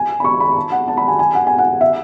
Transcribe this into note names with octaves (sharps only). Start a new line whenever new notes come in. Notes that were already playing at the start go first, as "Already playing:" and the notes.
Already playing: G#5
B5
C#6
B5
A5
F#5
A5
B5
G#5
G#5
F#5
G#5
F#5
E5